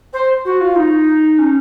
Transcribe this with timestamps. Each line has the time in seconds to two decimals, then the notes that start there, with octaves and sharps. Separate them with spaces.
0.13 C5
0.45 F#4
0.60 F4
0.75 D#4
1.38 C#4